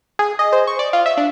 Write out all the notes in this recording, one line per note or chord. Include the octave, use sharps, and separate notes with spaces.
G#4
D#5
C5
C#6
D5
F4
E5
D4